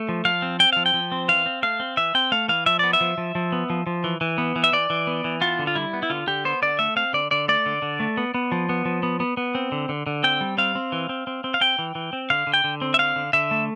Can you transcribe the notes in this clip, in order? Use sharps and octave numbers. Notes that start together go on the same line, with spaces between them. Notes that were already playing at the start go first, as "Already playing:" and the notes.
Already playing: A3
F3
F3 F5
C4
C4 G5
F3 F5
G5
F3
C4
E3 F5
C4
A3 F5
C4
E3 E5
C4 G5
A3 F5
E3 F5
F3 E5
B3 D5
E5
F3
F3
F3
B3
F3
F3
E3
E3
B3
E3
E5
E3 D5
E3
B3
E3
B3 F4
D3
F4
G3 E4
B3
E4
D3 F4
D3 G4
B3 C5
D3 D5
A3 E5
C4 F5
D3 D5
D3 D5
A3 D5
D3
D3
A3
B3
B3
F3
B3
F3
B3
B3
B3
C4
D3
D3
D3
C4 G5
G3
C4 F5
C4
E3
C4
C4
C4
F5
C4 G5
E3
E3
C4
D3 F5
D3
G5
D3
C4
E5
D3 F5
D3
D3 E5
A3